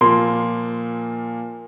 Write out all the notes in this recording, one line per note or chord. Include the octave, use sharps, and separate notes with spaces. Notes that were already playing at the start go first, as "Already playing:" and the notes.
A#2 F3 A#3 C6